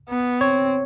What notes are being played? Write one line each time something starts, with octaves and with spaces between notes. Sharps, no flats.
B3
C4 C#5